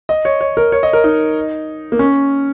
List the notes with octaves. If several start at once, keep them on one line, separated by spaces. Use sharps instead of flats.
D#5
C#5
C#5
A#4
C#5
D#5
A#4
D#4
A#3
C#4